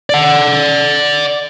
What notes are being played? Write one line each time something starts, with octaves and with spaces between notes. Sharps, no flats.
D5 F#5